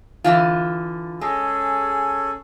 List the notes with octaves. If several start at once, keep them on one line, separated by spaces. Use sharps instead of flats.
D3 E3 F4
G#3 C#4 G#4 A4